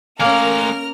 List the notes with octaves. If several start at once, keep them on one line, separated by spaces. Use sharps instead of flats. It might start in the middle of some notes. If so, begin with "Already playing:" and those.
A3 A#3 C#4 A#4 G#5 F6